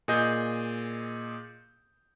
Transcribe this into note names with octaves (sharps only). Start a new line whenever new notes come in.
A#2 G#4 D#5 G6